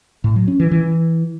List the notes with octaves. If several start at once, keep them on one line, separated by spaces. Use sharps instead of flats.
A2
F#3
C#4
E3
E3